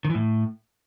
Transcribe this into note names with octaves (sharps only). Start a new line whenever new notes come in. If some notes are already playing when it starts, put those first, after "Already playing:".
D#3
E3
A2